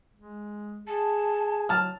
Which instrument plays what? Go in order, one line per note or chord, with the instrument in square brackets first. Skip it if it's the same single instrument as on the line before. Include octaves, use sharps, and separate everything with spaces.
[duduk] G#3
[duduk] G#4 [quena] A5
[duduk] F#3 [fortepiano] A5 F6